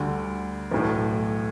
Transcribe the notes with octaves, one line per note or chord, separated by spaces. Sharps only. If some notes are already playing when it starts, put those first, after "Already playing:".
Already playing: D2 D3 G3
B1 A2 E3